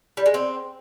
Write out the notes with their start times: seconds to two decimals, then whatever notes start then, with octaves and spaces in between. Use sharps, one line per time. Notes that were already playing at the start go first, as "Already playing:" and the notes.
0.17 G3
0.26 G#3
0.34 C4